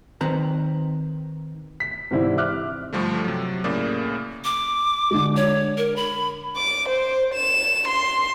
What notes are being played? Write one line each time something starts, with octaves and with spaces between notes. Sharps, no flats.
D#3 C4 B4 A#5
B6
G#2 C3 E3 C4 D4 E4
E5 D6 F6 F#6
G2 D3 F3 G3 A3
C3 F#3
A2 C#3 A#3 D5
D6
D3 G#3
C#5
A#4
B5
D6
C5
E7
C6